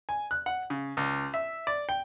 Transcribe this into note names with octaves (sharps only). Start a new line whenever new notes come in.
G#5
F#6
F#5
C#3
C#2
E5
D5
G5